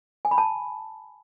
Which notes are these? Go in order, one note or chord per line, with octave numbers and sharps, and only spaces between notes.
G#5
B5
A5